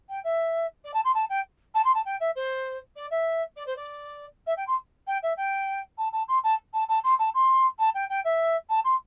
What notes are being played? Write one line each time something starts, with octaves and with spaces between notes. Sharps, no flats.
G5
E5
D5
A5
C6
A5
G5
A5
C6
A5
G5
E5
C5
D5
E5
D5
C5
D5
E5
G5
C6
G5
E5
G5
A5
A5
C6
A5
A5
A5
C6
A5
C6
A5
G5
G5
E5
A5
C6